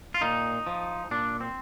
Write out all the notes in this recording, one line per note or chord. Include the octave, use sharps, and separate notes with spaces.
F4
A#2 D#4
F3
A#2 D4
C4